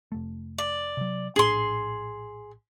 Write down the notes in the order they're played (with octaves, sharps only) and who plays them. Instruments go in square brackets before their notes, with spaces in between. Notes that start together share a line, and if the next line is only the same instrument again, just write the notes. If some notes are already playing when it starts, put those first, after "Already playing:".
[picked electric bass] F1 A3
[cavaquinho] D5
[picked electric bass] C3 F#3
[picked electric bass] A#1 A2 D4 [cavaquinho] G#4 C6